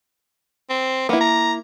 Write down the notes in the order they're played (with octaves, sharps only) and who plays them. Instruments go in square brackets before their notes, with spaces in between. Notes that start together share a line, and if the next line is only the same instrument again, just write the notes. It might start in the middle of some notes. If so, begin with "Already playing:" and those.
[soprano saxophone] C4
[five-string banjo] A#3 E4 [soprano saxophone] B3
[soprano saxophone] A#5